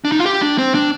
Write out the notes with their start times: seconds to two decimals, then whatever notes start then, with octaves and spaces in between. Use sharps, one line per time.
0.05 D4
0.12 D#4
0.19 F4
0.26 G4
0.42 D4
0.58 C4
0.75 D4